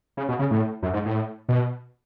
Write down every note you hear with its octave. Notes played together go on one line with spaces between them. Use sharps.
C#3
B2
C#3
A2
F#2
G#2
A2
B2